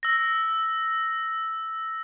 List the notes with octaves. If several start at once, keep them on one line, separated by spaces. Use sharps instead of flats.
E6 A#6